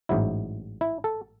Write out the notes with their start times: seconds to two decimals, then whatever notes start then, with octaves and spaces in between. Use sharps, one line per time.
0.09 A1 G#2 F#3 E4
0.81 E4
1.04 A4